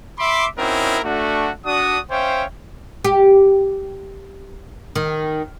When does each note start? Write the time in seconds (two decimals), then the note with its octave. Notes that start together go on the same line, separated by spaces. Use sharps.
0.19 E5 B5 C6 D6
0.59 C4 C#4 D#4 E4 F#4 A#4
1.05 A3 D4 F#4
1.67 D4 F#4 D#6
2.11 C#4 C5 C#5 E5 F5 G5
3.05 G4
4.95 D#3